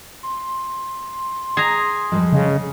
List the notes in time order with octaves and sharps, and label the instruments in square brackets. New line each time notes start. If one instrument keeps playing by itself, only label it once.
[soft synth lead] C6
[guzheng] G#4 A#5
[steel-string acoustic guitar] F2 G3 G#3
[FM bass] C#3 [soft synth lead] D#5